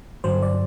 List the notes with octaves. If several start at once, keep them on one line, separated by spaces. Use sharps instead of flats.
G2 D3 F#3 C5
D5